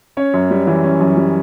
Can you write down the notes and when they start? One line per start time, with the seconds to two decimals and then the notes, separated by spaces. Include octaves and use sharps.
0.17 C#4 C#5
0.34 F#2
0.51 G3
0.67 E3
0.84 C#4
1.00 F#2
1.17 G3